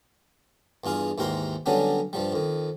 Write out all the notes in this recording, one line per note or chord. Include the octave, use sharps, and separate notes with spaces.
E2 G2 F4 G#4 F5
D#2 G#2 E3 G4 A#4 C6
D3 F#3 G3 B3 C#4 D4
G2 F3 G3
F2 D#3